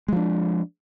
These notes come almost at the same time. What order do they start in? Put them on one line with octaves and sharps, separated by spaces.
G#3 F3 D4